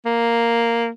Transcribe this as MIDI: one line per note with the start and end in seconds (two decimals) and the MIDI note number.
0.05 0.88 58